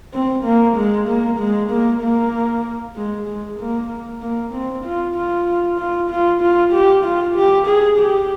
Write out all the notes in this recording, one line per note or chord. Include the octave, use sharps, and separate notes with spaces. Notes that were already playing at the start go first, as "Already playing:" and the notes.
C4
A#3
G#3
A#3
G#3
A#3
A#3
G#3
G#3
A#3
A#3
C4
F4
F4
F4
F4
F4
G4
F4
G4
G#4
G4